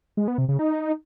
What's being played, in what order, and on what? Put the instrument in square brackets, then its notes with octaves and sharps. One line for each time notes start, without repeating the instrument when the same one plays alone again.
[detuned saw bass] G#3
B3
C3
C#3
D#4